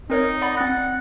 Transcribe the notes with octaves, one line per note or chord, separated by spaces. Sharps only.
C4 D#4 A#4 C#5
D5 F#5 B5
C4 F#5 A6